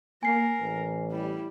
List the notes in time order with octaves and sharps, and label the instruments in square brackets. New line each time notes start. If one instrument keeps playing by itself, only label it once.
[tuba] A#3 [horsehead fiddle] A#4 [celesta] G#5 C7
[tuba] A1
[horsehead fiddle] G3 E4